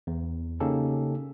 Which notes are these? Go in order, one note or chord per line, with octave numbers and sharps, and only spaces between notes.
E2
C#3 A#3 C#4 D#4 G4 A4